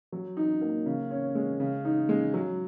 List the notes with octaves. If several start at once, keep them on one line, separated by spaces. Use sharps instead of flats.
F#3
D#4
A#3
C#3
C#4
G#3
C#3
D#4
G#3
F#3